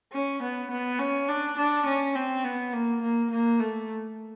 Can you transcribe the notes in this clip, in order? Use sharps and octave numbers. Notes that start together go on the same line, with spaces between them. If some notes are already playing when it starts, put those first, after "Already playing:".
C#4
B3
B3
C#4
D4
D4
C#4
C4
B3
A#3
A#3
A#3
A3